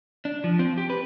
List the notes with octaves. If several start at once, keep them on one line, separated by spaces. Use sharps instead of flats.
D4
F3
C4
G4
B4